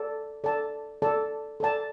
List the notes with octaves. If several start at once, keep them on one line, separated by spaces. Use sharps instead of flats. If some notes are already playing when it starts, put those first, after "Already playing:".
Already playing: A4 D5 A5
A4 D5 A5
A4 D5 A5
A4 D5 A5